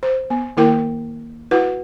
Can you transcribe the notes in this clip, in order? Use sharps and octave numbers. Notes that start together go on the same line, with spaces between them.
C5
B3
D#3 A#3 E4 A#4 G5
E4 F#4 B4 F#5